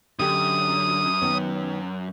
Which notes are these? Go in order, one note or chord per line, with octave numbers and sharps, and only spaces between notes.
F#2 D3 G4 D#6
D#3 B3 C#5